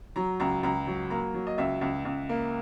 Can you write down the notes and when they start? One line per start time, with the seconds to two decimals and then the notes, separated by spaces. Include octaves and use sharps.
0.16 F#3 A#5
0.40 C#2 A#5
0.63 C#2 A#5
0.87 F#3
1.10 A#3 A#5
1.34 F#3
1.47 D#5
1.58 C#2 E5
1.81 C#2
2.05 C#2
2.29 A#3